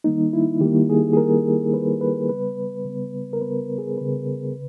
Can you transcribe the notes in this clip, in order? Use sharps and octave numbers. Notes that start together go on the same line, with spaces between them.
D#3 G3 A#3 D#4
E4
D#3 G3 A#3 G4
G#4
G#4
D#3 G3 A#3 A#4
D#3 G3 A#3 B4
B4
C#3 G3 B3 B4
C#3 G3 B3
A#4
C#3 G3 B3 B4
G#4
C#3 G3 B3 B4
C#3